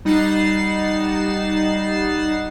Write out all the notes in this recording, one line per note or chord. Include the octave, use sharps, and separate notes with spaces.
G3 D#4 F#5 A6 C7 E7